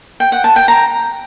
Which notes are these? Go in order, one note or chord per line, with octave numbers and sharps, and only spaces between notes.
G5
F#5
A5
G5
A#5